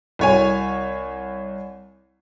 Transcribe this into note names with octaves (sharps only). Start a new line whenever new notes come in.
C2 C#5 G#5